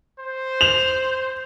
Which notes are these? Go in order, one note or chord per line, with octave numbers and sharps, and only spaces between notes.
C5
F7